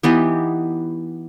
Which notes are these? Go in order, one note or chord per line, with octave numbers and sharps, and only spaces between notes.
E3 B3 D#4 G4